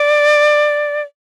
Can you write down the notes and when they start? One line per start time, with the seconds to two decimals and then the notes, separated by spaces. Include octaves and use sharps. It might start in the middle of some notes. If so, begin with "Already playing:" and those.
Already playing: D5